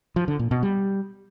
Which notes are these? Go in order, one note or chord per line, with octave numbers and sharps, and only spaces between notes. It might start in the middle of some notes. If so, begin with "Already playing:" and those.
F3
D3
A#2
B2
G3